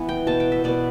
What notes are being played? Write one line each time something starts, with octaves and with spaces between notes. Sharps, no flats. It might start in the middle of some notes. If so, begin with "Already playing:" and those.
Already playing: E3 B3
G5
B2 B3 A5
G5
E5
B2 B3 D5